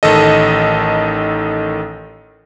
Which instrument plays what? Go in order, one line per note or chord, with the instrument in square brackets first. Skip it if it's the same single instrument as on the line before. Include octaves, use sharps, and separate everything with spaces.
[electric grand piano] A1 D#3 A4 D#5